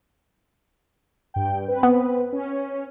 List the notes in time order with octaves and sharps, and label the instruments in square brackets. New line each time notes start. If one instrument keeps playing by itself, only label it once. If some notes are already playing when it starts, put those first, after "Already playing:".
[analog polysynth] G2 G5
C4 B4
[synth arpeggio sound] B3
[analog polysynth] C#4